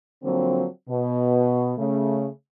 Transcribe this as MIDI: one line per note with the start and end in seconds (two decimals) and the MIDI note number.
0.23 0.65 50
0.23 0.65 53
0.23 0.65 54
0.23 0.65 58
0.23 0.65 60
0.89 1.72 47
1.78 2.27 49
1.78 2.27 57